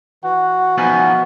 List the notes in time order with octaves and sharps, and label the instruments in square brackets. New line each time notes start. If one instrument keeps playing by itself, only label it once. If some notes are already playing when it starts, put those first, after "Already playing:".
[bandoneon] E3 F#4 [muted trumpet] F#5
[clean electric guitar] F3 B3 D#4 [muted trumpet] G#5